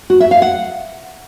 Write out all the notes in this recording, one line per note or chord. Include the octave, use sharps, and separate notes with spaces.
F#4
E5
F5
F#5